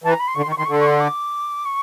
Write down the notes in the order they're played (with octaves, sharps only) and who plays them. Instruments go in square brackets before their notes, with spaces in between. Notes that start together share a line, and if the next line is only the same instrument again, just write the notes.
[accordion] E3 [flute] A5
[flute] A#5
B5
C6
[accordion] D3 [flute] C#6
[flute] C6
[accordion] D#3
[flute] C#6
[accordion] D#3 [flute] C6
[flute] C#6
[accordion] D3 [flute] C6
[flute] C#6
C6
D6
C#6